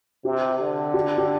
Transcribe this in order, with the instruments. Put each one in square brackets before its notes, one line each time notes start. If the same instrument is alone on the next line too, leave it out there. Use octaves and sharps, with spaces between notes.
[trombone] C3 [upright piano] G4
[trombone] D3
[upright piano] G4
G4